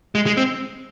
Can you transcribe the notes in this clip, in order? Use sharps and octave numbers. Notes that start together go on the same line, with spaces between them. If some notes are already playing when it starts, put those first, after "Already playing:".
G#3
G#3
C4